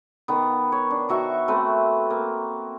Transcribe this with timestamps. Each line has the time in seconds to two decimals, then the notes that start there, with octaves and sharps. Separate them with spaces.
0.28 D#3 B3
0.72 C#5
0.90 D4
1.09 D#3 F#4 E5 C#6
1.48 A3 C4 B4
2.10 A#3